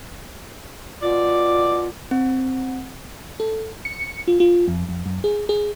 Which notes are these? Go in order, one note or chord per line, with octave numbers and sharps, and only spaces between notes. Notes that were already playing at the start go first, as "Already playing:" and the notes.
B2 F4 D5
C4
A4
C#7
F4
F4
F2
F2
F#2
G#4
G#4